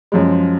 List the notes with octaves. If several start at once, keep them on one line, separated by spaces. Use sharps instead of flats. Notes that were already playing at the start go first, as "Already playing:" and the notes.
F#2 F3 G#3